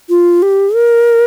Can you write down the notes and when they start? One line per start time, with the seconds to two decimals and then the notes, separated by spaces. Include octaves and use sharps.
0.09 F4
0.42 G4
0.74 A#4